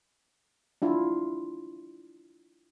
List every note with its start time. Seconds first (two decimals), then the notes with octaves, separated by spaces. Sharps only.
0.82 D4 E4 F4